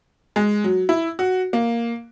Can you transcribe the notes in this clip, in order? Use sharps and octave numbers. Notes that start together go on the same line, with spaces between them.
G#3
F#3
E4
F#4
A#3